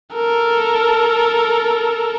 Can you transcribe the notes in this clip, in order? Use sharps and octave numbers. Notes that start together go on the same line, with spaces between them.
A4 A#4